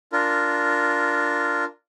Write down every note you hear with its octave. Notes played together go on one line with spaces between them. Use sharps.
D4 F4 A#4